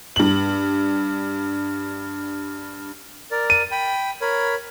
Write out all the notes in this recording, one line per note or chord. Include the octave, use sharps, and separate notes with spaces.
G2 F#7
A#4 D5
D#7
G5 B5
A#4 C#5 B5